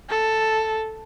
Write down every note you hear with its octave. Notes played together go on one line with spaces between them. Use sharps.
A4